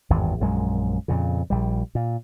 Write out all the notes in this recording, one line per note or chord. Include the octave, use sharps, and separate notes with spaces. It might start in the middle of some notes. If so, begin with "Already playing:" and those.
G#1 E2 G2
A#1 F#2 G#3
F2 A#2 C#3
A#1 G3
A#2